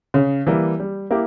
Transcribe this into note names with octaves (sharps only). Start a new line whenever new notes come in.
C#3
E3 G3 A#3
G3
A#3 E4 G4